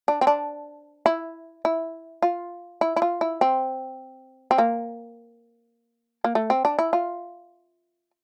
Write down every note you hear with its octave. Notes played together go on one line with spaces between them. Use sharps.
D4
C4
D4
E4
E4
F4
E4
E4
F4
E4
C4
C4
A#3
A#3
A3
C4
D4
E4
F4